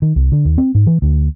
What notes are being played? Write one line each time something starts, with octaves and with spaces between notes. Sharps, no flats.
D#3
C2
D3
D#2
C4
G#2
E3
D2